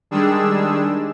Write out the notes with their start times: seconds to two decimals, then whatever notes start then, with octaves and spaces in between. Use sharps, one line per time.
0.11 D#3 G3 G#3 D4 G#4 E6